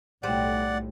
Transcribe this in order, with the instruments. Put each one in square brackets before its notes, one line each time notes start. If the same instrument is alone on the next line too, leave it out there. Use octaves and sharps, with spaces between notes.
[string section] B1 A2 [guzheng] G3 C5 [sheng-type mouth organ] D5 F#5